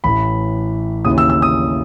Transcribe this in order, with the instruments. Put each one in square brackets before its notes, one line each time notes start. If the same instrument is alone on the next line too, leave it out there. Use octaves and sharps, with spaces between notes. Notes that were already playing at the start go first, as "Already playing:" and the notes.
[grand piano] A1 A2 E3 B5
D#2 C#3 E3 D#6
E6
E6
D#6